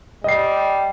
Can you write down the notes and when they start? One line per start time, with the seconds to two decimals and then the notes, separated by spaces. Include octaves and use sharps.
0.24 G3 D#5 C7